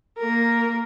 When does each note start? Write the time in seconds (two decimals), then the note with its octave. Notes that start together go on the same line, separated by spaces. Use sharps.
0.18 A#3 A#4